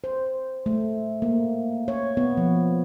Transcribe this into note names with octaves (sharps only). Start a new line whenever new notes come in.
C5
A3
A#3
C#5
B3
F3